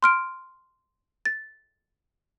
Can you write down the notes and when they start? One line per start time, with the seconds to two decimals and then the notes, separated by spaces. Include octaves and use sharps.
0.03 C6 F6 D7
1.25 A6